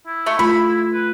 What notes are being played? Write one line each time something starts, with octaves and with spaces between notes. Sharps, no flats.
E4
A3
A3 F4 B5
B4